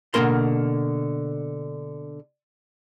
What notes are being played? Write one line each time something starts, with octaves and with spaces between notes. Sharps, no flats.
B2 D3 A#3 A#4 C6